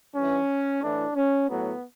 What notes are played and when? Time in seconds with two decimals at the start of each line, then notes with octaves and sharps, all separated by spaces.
0.15 G2 E3 C#4
0.82 A2 E3 D4
1.16 C#4
1.49 A2 F#3 B3